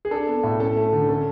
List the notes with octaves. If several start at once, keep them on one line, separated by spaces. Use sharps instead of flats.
G#4
D4 A4
B3
A2
C#4 A4
A3
D3
C#4 A4